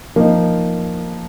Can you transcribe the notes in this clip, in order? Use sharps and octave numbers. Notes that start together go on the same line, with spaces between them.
F3 A#3 D#4